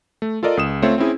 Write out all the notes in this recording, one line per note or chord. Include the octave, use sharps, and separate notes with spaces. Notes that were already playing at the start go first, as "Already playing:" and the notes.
A3
F4 A4 A#4 D5 D#5
C#2 D#6 E7
A3 C4 F4 C5 C#5 E5
C4 C#4 E4 G#4